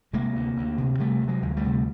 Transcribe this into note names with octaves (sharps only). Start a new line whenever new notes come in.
C3 G#3 A#3
D2
D2
C3
C3 G3 A3
D2
F#3 G#3
D2
G3 A3
C3